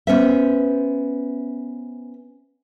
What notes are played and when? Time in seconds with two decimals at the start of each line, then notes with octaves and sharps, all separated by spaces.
0.07 B3 C#4 C5 E5